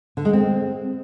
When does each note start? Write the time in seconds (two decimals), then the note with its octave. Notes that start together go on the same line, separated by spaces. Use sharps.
0.17 D3
0.25 G#3
0.33 C4